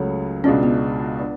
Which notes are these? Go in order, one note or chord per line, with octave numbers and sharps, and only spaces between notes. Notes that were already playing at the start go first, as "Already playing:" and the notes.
Already playing: C#2 C#3 F#3 A3
C#2 B2 G#3 C#4 D4 F4
B3
B3 D4